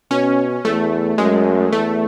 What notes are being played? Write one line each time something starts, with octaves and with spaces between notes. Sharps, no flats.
B2 C#4
E2 A3
F#2 G#3
E2 A3